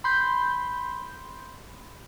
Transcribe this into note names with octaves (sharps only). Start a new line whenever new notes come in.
B5 C6 G6